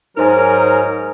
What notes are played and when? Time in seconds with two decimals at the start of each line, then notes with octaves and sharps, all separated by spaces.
0.17 G#2 F#3 D#4 A#4 C5 G#5